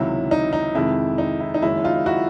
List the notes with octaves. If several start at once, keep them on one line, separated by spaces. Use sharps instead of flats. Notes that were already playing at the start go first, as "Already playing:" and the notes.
Already playing: C#2 C3 D#3 F#3 E4
D#4
D#4
F2 C3 D#3 G#3 E4
D#4
E4
D#4
F#1 F#2 D#3 G#3 E4
D#4 F4
E4 F#4